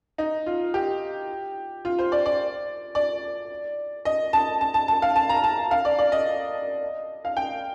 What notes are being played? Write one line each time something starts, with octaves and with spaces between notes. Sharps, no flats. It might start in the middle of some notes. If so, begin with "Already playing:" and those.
D#4
F4
G4
F4
C5
D5
D5
D5
D#5
A5
A5
A5
A5
F5
A5
A#5
A5
F5
D5
D5
D#5
F5
G5